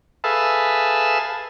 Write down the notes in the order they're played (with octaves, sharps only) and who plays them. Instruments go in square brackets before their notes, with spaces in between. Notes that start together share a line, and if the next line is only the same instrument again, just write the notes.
[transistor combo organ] G#4 A4 B4 E5 F5 A5